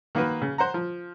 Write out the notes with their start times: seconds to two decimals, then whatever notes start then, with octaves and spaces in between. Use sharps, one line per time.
0.15 D#3 A#3 F#4 B4
0.42 C#3
0.58 C5 F#5 A#5
0.74 F3